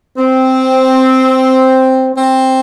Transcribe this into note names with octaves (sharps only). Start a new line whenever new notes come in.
C4
C4